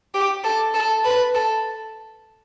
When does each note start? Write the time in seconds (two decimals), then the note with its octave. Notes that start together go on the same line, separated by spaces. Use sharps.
0.14 G4
0.44 A4
0.74 A4
1.05 B4
1.35 A4